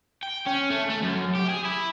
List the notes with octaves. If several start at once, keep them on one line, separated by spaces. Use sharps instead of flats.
G5
C#4
A3
A3
F#2
G4
G#4
E4